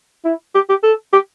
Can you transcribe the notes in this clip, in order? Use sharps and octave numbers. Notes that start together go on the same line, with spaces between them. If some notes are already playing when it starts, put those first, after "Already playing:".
E4
G4
G4
A4
G4